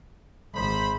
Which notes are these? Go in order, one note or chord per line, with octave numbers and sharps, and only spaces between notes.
G#1 C5 B5